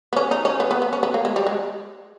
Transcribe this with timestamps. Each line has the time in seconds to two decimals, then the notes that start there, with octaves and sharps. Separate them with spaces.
0.13 B3
0.16 C#4
0.31 D#4
0.45 C#4
0.60 B3
0.71 B3
0.82 B3
0.93 C#4
1.03 B3
1.14 A#3
1.25 G#3
1.36 G3
1.47 G#3